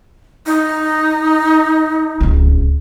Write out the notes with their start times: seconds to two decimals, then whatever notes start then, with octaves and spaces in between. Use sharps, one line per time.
0.46 D#4
2.21 D1 C#2